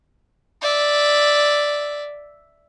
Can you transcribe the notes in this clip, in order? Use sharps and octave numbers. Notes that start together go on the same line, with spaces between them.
D5 E5